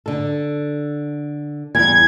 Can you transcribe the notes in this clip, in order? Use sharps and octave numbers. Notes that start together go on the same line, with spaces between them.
D3 A4
E2 G3 G#6